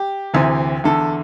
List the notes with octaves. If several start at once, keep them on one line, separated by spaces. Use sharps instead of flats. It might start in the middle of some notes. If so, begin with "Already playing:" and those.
Already playing: G4
D2 C3 E3
E2 D3 A4